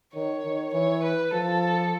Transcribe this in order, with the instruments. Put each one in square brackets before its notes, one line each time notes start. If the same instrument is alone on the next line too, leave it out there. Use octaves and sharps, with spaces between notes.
[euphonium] D#3 [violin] C#5
[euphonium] D#3
[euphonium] E3 [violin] C#5
[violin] B4
[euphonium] F3 [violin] A4